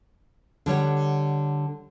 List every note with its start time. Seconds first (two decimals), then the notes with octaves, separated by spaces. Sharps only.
0.66 D3 G3 C#5 F#5